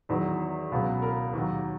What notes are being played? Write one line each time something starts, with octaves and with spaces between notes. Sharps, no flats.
E2 D#3 F#3
C#2 B2 F#3
A#4
D#2 D#3 F#3